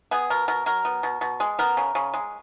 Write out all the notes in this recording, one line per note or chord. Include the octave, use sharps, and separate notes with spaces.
B3 G#4
B2 A#4
B2 A#4
F#3 A#4
B3
B2
B2
G#3
B3 A#4
C#3
C#3
G#3